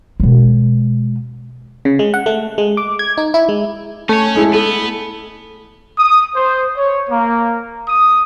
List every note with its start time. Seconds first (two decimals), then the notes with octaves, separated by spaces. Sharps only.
0.20 B2 G#3
1.85 C#3
1.99 G#3
2.14 F#5
2.26 A3
2.58 G#3
2.77 D6
2.99 G#6
3.18 D#4
3.34 E4
3.49 G#3
4.09 A3 C#4 C#5
4.35 G#3 E4 G#4
4.53 B3 A4
5.98 D#6
6.35 C5
6.78 C#5
7.10 A#3
7.89 D#6